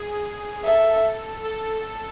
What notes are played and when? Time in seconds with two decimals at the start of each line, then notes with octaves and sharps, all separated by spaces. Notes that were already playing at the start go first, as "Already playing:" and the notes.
Already playing: G#4
0.64 A4 E5
1.44 A4